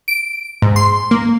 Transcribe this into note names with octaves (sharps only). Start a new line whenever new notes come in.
D7
G#2
C6
A#3